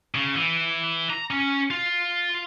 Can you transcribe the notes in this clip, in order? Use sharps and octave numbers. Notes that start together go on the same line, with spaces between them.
C#3
E3
A#5
C#4
F4